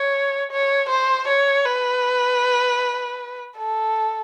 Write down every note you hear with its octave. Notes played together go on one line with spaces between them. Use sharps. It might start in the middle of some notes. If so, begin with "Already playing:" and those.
Already playing: C#5
C#5
C5
C#5
B4
A4